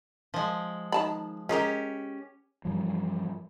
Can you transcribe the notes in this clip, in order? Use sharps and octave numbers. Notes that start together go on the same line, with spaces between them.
F3 G#3
D#3 A5 B5
G#3 C#4 G4 G#4 A#4
G2 E3 F3 G3